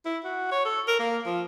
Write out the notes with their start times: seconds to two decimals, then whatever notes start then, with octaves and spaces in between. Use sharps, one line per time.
0.06 E4
0.24 F#4
0.51 C#5
0.65 A4
0.87 A#4
1.00 A#3
1.26 F3